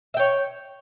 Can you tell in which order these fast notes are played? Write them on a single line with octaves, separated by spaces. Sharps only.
E5 G5 C#5